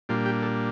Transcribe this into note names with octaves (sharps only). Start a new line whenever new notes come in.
A#2 G3 A#3 D4 F4
G4
A4